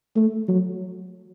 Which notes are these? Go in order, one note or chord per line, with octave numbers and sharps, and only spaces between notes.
A3
F#3